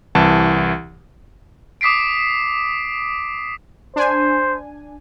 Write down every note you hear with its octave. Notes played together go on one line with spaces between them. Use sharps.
C2 E3 A5
D6 D#6 B6 C7 D7
D4 C5 G#5